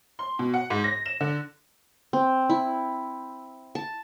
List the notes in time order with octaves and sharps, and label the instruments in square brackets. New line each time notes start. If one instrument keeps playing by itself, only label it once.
[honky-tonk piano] C6
B2
F#5
G#2
A#6
E7
D3
[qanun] C4
E4
A5